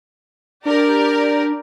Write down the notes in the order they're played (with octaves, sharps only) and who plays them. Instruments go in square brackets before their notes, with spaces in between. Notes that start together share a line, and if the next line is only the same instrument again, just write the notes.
[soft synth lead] D4 [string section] G4 A#4 D5